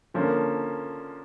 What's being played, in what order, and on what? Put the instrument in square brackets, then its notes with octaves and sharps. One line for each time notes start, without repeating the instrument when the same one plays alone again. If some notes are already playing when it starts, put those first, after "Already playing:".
[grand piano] D3 F3 A#3 C#4